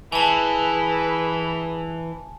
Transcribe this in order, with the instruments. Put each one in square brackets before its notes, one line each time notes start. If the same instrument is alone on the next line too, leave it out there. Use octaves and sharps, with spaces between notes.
[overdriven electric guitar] E3 [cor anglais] E4 [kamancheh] G#4 B4 [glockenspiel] G#5 A5